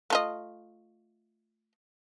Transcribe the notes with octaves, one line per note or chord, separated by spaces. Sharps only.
A3 F4 D#5